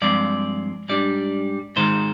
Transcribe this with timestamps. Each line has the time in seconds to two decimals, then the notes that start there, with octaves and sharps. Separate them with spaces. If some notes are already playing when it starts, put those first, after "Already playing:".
0.02 G2 F3 G#3 C4 D5
0.89 G#2 G3 D4 D5
1.76 G#2 D#3 G#3 C5